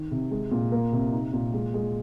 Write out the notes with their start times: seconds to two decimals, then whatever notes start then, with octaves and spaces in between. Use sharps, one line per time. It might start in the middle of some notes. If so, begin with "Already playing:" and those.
Already playing: D#3
0.11 C3
0.31 G#3
0.51 A#2
0.72 A#3
0.93 C3
1.12 D#4
1.33 A#2
1.53 G#3
1.74 G#3